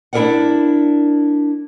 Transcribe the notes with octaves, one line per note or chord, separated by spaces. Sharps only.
D4 E4 G#4 A#4 D5 F#5